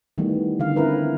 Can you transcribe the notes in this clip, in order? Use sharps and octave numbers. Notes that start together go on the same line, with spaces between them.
D#3 E3 G3 A3 B3
D3 D#3 F5
C4 E4 A#4 B4